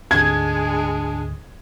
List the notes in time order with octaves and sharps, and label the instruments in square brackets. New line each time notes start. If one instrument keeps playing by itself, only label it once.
[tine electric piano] D2 G#2 D3 [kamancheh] G#3 G#4 [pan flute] D4 [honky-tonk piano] G#6